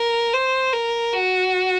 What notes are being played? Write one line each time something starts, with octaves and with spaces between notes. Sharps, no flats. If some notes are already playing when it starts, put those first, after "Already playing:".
Already playing: A#4
C5
A#4
F#4